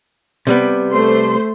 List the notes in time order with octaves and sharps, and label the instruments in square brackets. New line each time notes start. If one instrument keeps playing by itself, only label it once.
[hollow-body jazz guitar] C3 G3 B3
[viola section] A3 C5 C6